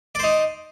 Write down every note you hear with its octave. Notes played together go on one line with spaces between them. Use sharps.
D#4 C5 D5